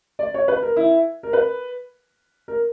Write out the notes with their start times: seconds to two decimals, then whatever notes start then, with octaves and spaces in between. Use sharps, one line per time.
0.19 D5
0.34 C#5
0.48 B4
0.62 A#4
0.77 E4
1.23 A#4
1.33 B4
2.48 A#4